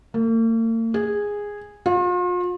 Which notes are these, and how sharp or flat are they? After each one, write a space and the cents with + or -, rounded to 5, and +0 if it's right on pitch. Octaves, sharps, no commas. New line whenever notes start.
A#3 -45
G#4 -10
F4 +40